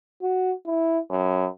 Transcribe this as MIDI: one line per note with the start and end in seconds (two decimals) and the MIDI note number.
0.22 0.53 66
0.66 0.99 64
1.10 1.47 42